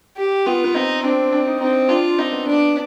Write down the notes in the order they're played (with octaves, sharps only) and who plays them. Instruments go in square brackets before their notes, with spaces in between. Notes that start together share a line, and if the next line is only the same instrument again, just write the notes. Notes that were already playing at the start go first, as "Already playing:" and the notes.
[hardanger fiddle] G4
[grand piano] B3 [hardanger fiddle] F4
[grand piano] B3
[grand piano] C4 [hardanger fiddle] D#4
[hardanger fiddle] C4 [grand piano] D4
[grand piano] D4
D#4
[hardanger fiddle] C4 [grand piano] D#4
[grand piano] D4 [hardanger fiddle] F4
[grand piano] C4 [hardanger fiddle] D#4
[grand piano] B3
[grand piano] B3 [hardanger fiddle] D4